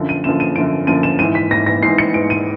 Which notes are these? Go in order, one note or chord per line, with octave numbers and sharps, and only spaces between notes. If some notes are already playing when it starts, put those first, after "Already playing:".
Already playing: F#2 D3 F3
D#7
F#2 D3 F3 E7
D#7
F#2 D3 F3 D7
F#2 D3 F3 D#7
E7
G#2 E3 D#7
B6
G#2 E3 A#6
A#6
G#2 E3 C7
C#7
G#2 E3 D7
D#7